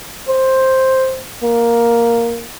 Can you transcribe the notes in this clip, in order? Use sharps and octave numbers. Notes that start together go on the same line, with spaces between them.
C5
A#3